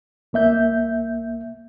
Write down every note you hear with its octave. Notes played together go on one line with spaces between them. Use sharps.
C2 A#3 E5 G6